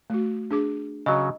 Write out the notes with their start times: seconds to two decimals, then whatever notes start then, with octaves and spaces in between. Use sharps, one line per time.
0.10 A3 F#4
0.51 D4 G#4 D6
1.06 C#3 F#3 D#5